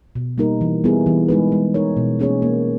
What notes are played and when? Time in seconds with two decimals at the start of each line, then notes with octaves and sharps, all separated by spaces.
0.15 B2
0.38 G3 A#3 D#4 A#4
0.61 E3
0.84 G3 B3 E4 G#4
1.06 E3
1.28 G#3 D#4 G#4 B4
1.52 G#3
1.74 D#4 A#4 C#5
1.97 B2
2.19 A#3 C#4 G#4 C#5
2.42 A#3